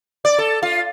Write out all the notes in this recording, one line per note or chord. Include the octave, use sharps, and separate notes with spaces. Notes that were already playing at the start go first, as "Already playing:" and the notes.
D5
A4
F4